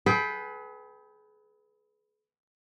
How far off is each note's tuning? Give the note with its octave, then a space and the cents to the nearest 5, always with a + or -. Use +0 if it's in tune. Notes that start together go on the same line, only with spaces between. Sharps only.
G#4 +40 B4 +0 G5 +0